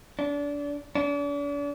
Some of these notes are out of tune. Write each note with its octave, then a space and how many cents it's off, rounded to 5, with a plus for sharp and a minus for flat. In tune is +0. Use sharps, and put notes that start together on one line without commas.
D4 -30
D4 -40